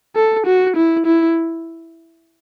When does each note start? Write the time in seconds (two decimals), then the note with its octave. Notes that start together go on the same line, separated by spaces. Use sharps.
0.16 A4
0.46 F#4
0.76 E4
1.06 E4